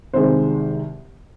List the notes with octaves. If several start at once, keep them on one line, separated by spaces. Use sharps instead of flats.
C2 C3 D#3 G#3 C5